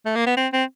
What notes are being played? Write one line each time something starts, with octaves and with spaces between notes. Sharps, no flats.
A3
A#3
B3
C4
C4